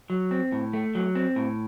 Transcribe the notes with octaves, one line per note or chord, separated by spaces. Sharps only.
F#3
C4
A2
A3
F#3
C4
A2